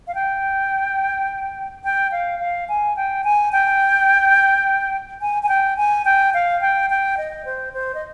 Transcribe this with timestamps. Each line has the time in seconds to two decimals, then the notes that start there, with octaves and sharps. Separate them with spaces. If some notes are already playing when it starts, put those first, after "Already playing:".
0.07 F5
0.15 G5
1.84 G5
2.12 F5
2.39 F5
2.69 G#5
2.96 G5
3.24 G#5
3.52 G5
5.21 G#5
5.43 G#5
5.49 G5
5.77 G#5
6.05 G5
6.34 F5
6.61 G5
6.90 G5
7.17 D#5
7.45 C5
7.73 C5
7.95 D#5